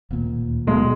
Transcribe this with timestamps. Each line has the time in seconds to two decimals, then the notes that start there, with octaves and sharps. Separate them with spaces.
0.11 D1 D#2 A#2
0.67 B1 G#3 B3